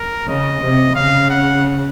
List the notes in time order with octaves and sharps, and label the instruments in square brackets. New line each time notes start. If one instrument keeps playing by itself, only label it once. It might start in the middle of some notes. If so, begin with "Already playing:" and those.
Already playing: [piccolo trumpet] A#4
[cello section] C#3 [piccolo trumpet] D#5
[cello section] C3
[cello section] C#3 [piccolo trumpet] F5
[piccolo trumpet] F#5